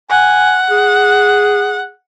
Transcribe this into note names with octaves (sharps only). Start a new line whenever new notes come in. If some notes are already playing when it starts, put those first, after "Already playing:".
F#5 G#5
G#4